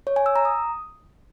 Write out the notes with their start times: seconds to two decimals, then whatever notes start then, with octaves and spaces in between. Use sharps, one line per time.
0.07 C#5
0.16 G#5
0.26 E6
0.36 A#5
0.45 D#6